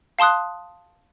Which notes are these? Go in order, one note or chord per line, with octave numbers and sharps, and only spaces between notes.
F5 A5 C6 D#6 F#6